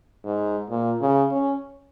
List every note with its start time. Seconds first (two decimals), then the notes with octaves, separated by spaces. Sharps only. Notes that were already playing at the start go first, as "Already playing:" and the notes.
0.25 G#2
0.70 A#2
1.01 C#3
1.31 C#4